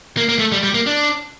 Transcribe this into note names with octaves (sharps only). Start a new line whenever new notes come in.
A#3
A#3
A3
G3
G3
A#3
D4